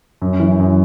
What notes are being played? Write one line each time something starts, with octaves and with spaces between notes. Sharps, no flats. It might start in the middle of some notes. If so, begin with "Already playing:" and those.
F#2
E3
F#2